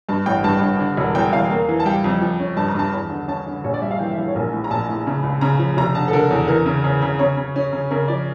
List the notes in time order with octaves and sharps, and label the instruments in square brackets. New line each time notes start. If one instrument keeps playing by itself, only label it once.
[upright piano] G2 A5
A1 G5
G2 A5
G2
D3
E1
E2 G5
E2 F5
A#3
E3
A5
G3 G5
F2
F3
C#4
G2 A5
A#5
G2 A5
E2
D3
C#4 A5
D3
A#1 C#5
D5
G3 E5
F5
E3 G5
E5
E3
C#5
A#1 A#4
A2
A#5
A#1 A5
A2
C#3
C#2
C#3 A#5
F3
F1 A#5
D3 A5
A4
D3 A#4
E2
E3 A#4
C#3
C#3
C#3
C#3 C#5
C#3
C#4
C#3
C#3 A#4
F3 D5